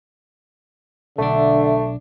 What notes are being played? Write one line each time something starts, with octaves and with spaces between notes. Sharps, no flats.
B1 D3 A3 D4 E5